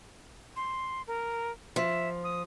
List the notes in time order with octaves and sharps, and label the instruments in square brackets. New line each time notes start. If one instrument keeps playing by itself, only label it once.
[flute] C6
A#4
[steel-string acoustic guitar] F3 [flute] E5
[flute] D#6